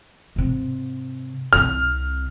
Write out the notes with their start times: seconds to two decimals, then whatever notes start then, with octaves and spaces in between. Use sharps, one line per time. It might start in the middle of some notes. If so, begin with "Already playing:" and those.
0.36 G#2 C3
1.53 C2 C3 F6